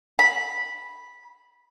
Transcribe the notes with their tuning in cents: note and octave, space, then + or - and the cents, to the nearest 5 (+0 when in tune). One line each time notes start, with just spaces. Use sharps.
B5 -10